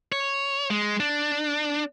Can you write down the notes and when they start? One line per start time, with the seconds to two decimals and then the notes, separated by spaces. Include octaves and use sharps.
0.12 C#5
0.70 G#3
1.00 D4